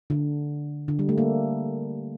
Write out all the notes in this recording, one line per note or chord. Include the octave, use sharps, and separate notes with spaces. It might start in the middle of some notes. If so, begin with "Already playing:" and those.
D3
D3
G3
A3
A#3